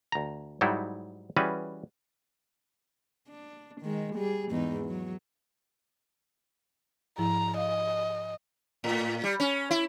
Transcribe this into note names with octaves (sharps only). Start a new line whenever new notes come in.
D2 A#5
G#2 F#3 G3 D#4 E4
E3 G3 C#4 F#4 G#4 B4
D4
D#3 G#3
G3 G#4
E2 G#2 D#4
F#3
G#2 F3 E4 A#5
D#5 F5
A2
G3
C#4
E4